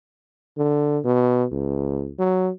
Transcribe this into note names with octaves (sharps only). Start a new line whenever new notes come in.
D3
B2
C#2
F#3